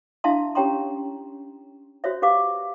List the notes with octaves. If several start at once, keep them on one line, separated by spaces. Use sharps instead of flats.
D4 E4 E5 F5 A5 C6
C#4 G4 C#5 G5 A#5 C6
F#4 C5 C#5 E5
G4 B4 F5 D6